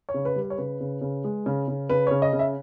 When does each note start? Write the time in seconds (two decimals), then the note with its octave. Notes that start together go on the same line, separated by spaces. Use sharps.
0.09 C#5
0.14 C#3
0.25 B4
0.36 G3
0.42 B4
0.50 C#5
0.58 C#3 B4
0.80 C#3
1.01 C#3
1.24 G#3
1.46 C#3
1.68 C#3
1.90 C#3 B4
2.07 C#3 C#5
2.22 D#5
2.33 C#3
2.39 E5